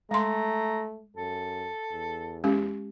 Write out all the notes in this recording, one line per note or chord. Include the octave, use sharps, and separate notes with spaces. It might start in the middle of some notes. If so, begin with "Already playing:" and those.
G#3 A3 A#5 C6
F#2 A4
E2
G#3 C#4 G4